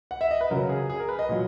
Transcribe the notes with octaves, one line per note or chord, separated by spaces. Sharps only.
F#5
E5
D#5
B4
C#3 F#3 A#4
G#4
G#4
A#4
B4
D#5
A#2 F#3